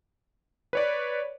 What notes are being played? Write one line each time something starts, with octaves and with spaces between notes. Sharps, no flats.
B4 C#5 D5